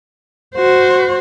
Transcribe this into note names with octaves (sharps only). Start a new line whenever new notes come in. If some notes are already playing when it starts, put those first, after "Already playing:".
F#4 C5